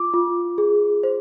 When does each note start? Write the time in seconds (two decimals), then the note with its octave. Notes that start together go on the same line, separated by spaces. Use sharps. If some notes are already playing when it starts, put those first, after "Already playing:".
Already playing: F4 D6
0.14 F4
0.58 G#4
1.03 C5